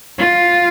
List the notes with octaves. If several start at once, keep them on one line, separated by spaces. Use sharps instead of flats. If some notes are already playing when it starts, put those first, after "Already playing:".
F4